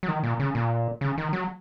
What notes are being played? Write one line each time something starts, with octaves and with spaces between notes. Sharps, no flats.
F#3
D#3
A#2
C#3
A#2
C#3
D#3
F#3